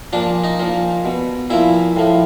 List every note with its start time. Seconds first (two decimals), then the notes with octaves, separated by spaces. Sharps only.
0.13 A#2 F3 D4
0.44 D#4
0.59 A#2 F3
1.05 B2
1.50 A#2 F3 E4
1.96 A2 F3